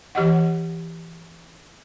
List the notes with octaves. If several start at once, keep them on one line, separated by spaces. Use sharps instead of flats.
E3 G4 D#5 F#5